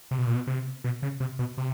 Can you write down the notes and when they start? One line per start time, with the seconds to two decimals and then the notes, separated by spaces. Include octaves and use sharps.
0.11 C3
0.18 B2
0.27 A#2
0.35 B2
0.47 C3
0.84 B2
1.03 C#3
1.20 C3
1.39 B2
1.58 C3